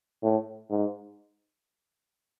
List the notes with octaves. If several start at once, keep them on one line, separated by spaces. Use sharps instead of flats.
A2
G#2